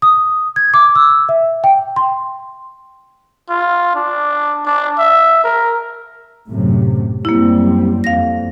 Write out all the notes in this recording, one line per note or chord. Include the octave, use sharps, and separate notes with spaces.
D#6
G#6
D6
E6
E5
G5
C6
F4
D4
D4
E5
A#4
F#2 A2 C3
F#2 G3 A#3 C4 E4
F2 F5 A#6